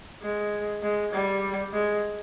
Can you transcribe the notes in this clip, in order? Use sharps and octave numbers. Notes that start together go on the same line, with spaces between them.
G#3
G#3
G3
G#3